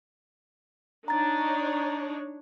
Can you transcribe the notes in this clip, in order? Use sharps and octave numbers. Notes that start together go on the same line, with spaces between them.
D4 D#4 C#5 A#5 A6